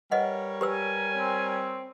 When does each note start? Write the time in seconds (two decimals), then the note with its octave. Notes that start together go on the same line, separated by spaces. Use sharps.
0.11 G3 A#4 B4 C#5 D#5 F#5
0.61 G4 B4 G#5 E6
1.18 C4